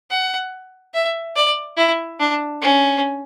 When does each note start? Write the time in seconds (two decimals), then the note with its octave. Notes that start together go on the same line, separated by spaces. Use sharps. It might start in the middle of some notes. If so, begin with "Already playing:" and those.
0.10 F#5
0.94 E5
1.36 D5
1.77 E4
2.20 D4
2.61 C#4